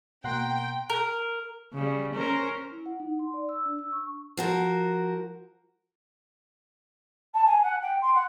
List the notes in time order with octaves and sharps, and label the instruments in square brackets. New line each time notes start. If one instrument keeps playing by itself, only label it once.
[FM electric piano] B2 A#3 [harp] F#5 A#5 C6 [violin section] G5
[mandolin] A#4
[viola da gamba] C#3 G3
C#4 A#4 C5
[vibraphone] E4
F#5
D#4
C6
D5
E6
D4
E6
C#6
[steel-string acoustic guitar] F3 F#4 A#4
[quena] A5
G#5
F#5
G5
C6
F#5